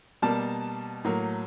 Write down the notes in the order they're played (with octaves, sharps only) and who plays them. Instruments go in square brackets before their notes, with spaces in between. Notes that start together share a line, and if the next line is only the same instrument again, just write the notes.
[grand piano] B2 G3 A#3 A5
A2 F#3 A#3